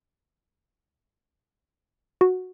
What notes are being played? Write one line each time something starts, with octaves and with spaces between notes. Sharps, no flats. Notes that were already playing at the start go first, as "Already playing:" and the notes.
F#4